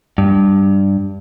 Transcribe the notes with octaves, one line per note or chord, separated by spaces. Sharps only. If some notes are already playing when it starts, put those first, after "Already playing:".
G2